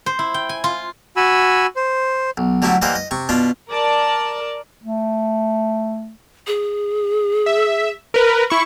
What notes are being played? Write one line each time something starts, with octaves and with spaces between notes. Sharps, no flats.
C5
E4
G5
G#5
F4
F#4 G#5 B5 E6
C5
B1
D3 F#3 G3 A3 E4
E3 G3 A#3 C5 D#5 F#5
D#5
C3 C#6
B2 B3 D4 F4
A#4 D5 A5
A3
G#4
E5
A#4 B4
E4 B5 C#6